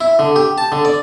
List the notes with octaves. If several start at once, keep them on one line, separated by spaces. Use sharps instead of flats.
E4
D3
G4
A5
D3
D5